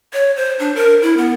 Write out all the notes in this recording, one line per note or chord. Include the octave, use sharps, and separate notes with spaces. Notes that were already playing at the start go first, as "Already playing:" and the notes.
C#5
C5
D4
A#4
E4
B3